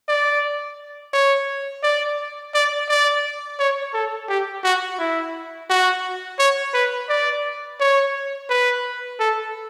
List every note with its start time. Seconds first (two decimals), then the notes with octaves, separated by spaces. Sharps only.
0.08 D5
1.13 C#5
1.83 D5
2.54 D5
2.89 D5
3.59 C#5
3.94 A4
4.29 G4
4.64 F#4
4.99 E4
5.70 F#4
6.39 C#5
6.74 B4
7.09 D5
7.80 C#5
8.50 B4
9.20 A4